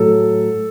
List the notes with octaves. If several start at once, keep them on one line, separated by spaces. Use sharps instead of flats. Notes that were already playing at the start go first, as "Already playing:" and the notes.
Already playing: A2 F#3 A4